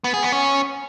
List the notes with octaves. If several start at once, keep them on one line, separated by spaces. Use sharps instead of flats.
B3
G#4
B3
C#4